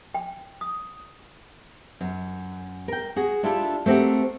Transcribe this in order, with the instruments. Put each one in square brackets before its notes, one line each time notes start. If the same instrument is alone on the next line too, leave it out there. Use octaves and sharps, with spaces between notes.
[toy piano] G5
D#6
[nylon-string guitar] F#2
A#4 G5
F#4 G#4
D4 E4 F4 G4 A4
A3 C4 F#4 G4 A#4